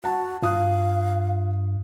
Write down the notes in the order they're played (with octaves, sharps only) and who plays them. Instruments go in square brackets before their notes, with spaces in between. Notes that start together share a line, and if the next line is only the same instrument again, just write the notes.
[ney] F#4 [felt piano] F#5 A5
[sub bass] G2 [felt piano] F4 D#6 F#6 [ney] F5